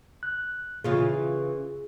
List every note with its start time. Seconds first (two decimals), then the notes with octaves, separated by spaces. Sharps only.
0.23 F#6
0.84 C#3 E3 F4 G#4